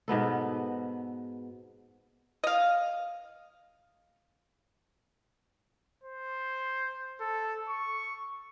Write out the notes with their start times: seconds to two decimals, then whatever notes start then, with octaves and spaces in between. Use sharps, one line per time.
0.08 G#2 B2 B3 A4
2.44 D#5 F5
6.03 C5
7.20 A4
7.69 C#6